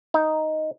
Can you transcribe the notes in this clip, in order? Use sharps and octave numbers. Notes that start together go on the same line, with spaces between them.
D#4